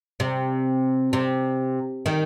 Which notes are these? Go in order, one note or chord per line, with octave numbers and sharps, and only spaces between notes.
C3
C3
D#3